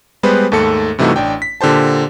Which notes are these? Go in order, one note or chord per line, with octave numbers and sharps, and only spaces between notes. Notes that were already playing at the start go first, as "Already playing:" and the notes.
G3 G#3 B3 B4 C5
D#2 G#2 A3 A4 C#7
G2 C3 E3 A3 D#4 F#4
A1 D4 G5
B6
A#2 D3 G4 C5 A5